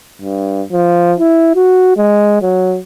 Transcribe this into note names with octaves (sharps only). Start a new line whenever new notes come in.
G2
F3
E4
F#4
G#3
F#3